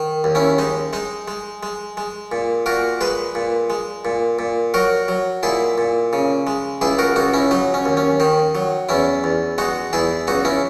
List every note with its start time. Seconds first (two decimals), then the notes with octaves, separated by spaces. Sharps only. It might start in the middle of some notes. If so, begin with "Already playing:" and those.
Already playing: D#3
0.24 D#2
0.35 C#4 E4
0.58 G#3 D#4
0.93 G#3 D#4
1.28 G#3
1.63 G#3
1.97 G#3
2.32 A#2
2.66 A#2 F#4 A#4
3.01 G#3 G#4 B4
3.35 A#2
3.70 G#3
4.05 A#2
4.39 A#2
4.74 F#3 F#4 A#4
5.08 F#3
5.43 A#2 E4 G#4
5.78 A#2
6.13 C#3
6.47 G#3
6.81 C#2 E4 G#4
6.99 F#4 A#4
7.16 C#2 D#4 F#4
7.34 C#4 E4
7.51 F#3 D#4
7.74 C#4
7.85 D#2
7.97 C#4
8.20 D#3 D#4
8.55 F#3
8.89 E2 C#4 E4
9.24 E2
9.58 G#3 D#4 F#4
9.93 E2 E4 G#4
10.27 C#2 D#4 F#4
10.45 C#4 E4